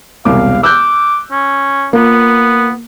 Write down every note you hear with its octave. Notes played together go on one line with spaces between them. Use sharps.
E1 C2 F5 D6
D6 E6 F#6 G6
C#4
A#3 B3 F4